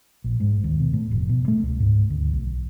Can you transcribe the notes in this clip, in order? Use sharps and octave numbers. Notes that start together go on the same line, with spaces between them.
A#1
G#2
D#2
B2
A2
F1
B2
A3
C#2
G#2
D2
B1